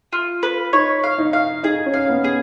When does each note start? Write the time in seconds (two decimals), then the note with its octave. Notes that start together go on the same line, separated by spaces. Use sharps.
0.13 F4
0.43 B4
0.73 D#4 C#5
1.04 F5
1.18 D#4
1.33 F5
1.63 D#4 G#4
1.86 C#4
1.94 F5
2.09 B3
2.24 G#4